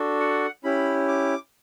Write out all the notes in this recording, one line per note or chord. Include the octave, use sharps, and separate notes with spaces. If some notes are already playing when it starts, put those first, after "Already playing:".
Already playing: D4 F#4 A4
F#5
C#4 E4 G4 B5
D6